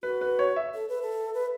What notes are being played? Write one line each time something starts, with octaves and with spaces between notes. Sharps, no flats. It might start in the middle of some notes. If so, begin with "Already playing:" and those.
F#4 B4
B4
C#5
E5
A4
B4
A4
B4